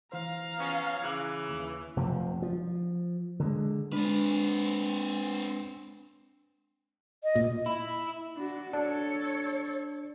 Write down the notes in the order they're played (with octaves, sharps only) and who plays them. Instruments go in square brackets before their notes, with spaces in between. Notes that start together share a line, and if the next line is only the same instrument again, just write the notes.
[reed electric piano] E3 C5 [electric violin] F5 A#5
[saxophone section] F3 B3 C#4
[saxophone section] C#3 E3 [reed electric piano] D6 F#6 G#6
[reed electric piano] D#2
[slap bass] F1 C3 F3
F3
D3 G#3
[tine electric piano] G#3 D4 [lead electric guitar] C4 B4
[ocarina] D#5
[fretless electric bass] A#2
[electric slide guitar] E4
[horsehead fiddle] D4 F#4
[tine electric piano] D4 [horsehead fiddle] A4 C#5